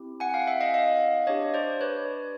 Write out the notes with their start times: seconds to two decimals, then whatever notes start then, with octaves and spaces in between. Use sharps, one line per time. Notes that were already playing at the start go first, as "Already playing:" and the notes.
Already playing: C4 E4 G4
0.20 F#5 G#5
0.30 F#5
0.34 F5 G5
0.47 E5 F#5
0.61 D#5 F5
0.74 D#5 F5
1.27 D4 G4 C#5 D#5
1.54 C5 D5
1.81 B4 C#5